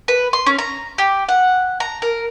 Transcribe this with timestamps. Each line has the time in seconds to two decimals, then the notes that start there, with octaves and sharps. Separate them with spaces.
0.08 B4
0.33 C6
0.47 C#4
0.58 A#5
0.98 G4
1.29 F#5
1.80 A#5
2.02 A#4